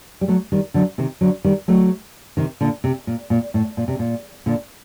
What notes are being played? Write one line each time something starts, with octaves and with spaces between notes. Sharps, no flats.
G3
F#3 A3
D#3 G3
D3 F#3
C3 D#3
D3 F#3
D#3 G3
F#3 A3
C3 D#3
A#2 D3
C3
A#2
A#2
A2
A#2
C3
A#2
A#2 D3